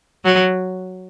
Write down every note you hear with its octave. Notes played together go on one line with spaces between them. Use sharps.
F#3